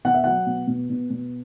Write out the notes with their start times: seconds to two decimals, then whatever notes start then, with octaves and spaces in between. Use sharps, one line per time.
0.05 B2 F#5
0.14 E5
0.24 F#3 F#5
0.46 B2
0.67 B2
0.90 B2
1.10 B2